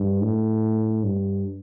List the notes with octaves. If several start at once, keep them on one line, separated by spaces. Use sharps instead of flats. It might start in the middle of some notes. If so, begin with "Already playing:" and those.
Already playing: G2
A2
G2